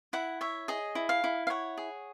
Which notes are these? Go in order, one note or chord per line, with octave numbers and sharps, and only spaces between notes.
E4 F#5
C#5 E5
G#4 D#5
E4
F5
E4
F5
C#5 F#5
G#4